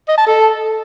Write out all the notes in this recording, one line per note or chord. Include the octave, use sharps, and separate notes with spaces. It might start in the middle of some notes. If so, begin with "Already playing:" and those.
D#5
A5
A4